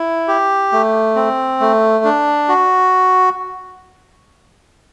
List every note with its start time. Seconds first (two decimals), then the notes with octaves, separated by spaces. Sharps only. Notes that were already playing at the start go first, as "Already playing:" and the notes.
Already playing: E4
0.28 G4
0.72 A3
1.16 C4
1.60 A3
2.04 D4
2.49 F#4